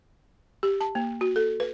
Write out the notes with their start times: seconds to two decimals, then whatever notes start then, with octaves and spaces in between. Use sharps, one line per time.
0.63 G4
0.81 A5
0.95 A#3
1.21 F#4
1.36 A4
1.60 B4